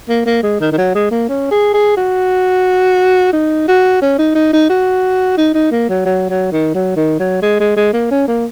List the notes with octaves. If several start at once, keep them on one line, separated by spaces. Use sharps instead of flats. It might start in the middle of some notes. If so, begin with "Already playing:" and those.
A#3
A#3
G#3
D#3
D#3
F#3
G#3
A#3
C#4
G#4
G#4
F#4
D#4
F#4
C#4
D#4
D#4
D#4
F#4
D#4
D#4
A#3
F#3
F#3
F#3
D#3
F#3
D#3
F#3
G#3
G#3
G#3
A#3
C#4
A#3